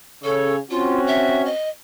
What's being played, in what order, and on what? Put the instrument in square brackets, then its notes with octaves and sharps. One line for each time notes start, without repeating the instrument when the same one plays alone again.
[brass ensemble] C#3 C#5 [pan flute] A4
[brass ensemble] C4 C#4 F#4 [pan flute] F4
[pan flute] E5
D#5